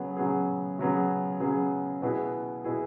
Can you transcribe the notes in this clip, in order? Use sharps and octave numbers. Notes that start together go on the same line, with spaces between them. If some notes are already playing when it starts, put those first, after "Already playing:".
Already playing: C#3 F#3 B3 G#4
C#3 F#3 B3 G#4
C#3 F#3 B3 G#4
C#3 F#3 B3 G#4
B2 B3 E4 G#4
B2 B3 E4 G#4